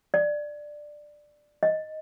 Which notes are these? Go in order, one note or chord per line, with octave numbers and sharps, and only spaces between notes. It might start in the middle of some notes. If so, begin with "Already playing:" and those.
D5
D#5